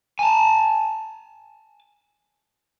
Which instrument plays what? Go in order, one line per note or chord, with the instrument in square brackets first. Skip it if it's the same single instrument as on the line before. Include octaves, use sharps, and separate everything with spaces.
[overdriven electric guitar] G#5 A5